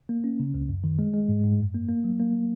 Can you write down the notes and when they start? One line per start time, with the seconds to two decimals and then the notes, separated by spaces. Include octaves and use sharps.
0.09 A#3
0.24 C#4
0.40 C#3
0.54 C#2
0.69 F#2
0.84 D#3
0.99 G#3
1.14 G#3
1.28 G#2
1.44 G#2
1.59 F#2
1.74 A#3
1.89 A#3
2.04 F#3
2.20 A#3